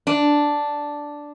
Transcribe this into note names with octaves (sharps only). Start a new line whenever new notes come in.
D4